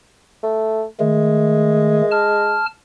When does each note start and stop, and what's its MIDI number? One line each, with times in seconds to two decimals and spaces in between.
0.43 0.84 57
1.00 2.02 51
1.00 2.59 56
1.00 2.02 57
2.11 2.66 81
2.11 2.66 89